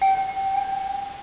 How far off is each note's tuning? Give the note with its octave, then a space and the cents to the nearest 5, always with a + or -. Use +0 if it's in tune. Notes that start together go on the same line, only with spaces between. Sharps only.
G5 -20
G5 +35